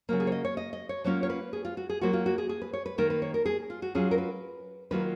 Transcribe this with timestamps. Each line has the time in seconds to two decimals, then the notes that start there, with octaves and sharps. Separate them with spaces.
0.09 C#3 F#3 A#3 A#4
0.20 G#4
0.27 C#5
0.32 D#5
0.45 C#5
0.57 D#5
0.73 D#5
0.89 C#5
1.04 F#3 A#3 C#4 F4 C#5
1.23 C#5
1.30 B4
1.53 G#4
1.65 F4
1.77 F#4
1.90 G#4
2.01 F#3 A#3 F4 F#4
2.13 F4
2.26 F#4
2.38 G#4
2.49 G#4
2.62 B4
2.73 C#5
2.86 B4
2.98 D#3 A#3 D#4 A#4
3.10 B4
3.22 C#5
3.34 A#4
3.46 G#4
3.70 F4
3.82 F#4
3.95 F#3 C#4 F4 G#4
4.11 A#4
4.18 B4
4.91 D#3 F#3 A#3 F4 B4